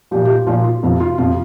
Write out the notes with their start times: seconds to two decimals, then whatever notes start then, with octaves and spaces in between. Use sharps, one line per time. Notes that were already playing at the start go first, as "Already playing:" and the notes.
0.11 A#2 F3 G4
0.25 G4
0.29 F4
0.47 A#2 F3 F4
0.64 F4
0.83 F2 C3 F3
1.00 F4
1.18 F2 C3 F3 F4